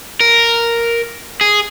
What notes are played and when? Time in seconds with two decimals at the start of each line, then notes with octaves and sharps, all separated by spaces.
0.20 A#4
1.41 G#4